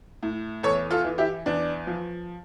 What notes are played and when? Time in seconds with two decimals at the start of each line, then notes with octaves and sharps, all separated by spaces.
0.23 A2
0.63 E2 A4 C#5
0.91 F4 A4
1.05 E3
1.18 E4 G4
1.46 E2 D4
1.87 F3